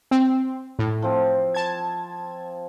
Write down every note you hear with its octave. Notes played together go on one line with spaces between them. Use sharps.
C4
A2
F3 C4
A5 G#6